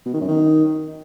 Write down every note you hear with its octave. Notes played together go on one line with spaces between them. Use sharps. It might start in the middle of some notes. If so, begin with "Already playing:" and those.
B2
D#3
F#2
D#3